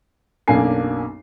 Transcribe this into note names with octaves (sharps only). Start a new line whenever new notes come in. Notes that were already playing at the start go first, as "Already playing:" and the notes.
B1 F#2 A#3 D4 G#5 C7